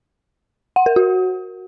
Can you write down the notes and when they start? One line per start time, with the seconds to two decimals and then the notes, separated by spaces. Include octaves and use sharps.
0.76 F#5
0.86 A#4
0.96 F#4